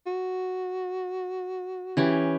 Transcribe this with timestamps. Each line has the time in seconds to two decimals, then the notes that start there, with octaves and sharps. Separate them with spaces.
0.07 F#4
1.97 E3 C#4 G4